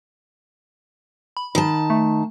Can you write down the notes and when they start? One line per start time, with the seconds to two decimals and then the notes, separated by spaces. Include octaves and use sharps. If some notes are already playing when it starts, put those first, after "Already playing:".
1.37 B5
1.55 D#3 A5
1.90 A3